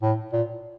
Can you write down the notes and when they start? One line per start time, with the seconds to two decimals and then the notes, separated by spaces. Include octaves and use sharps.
0.03 A2
0.33 A#2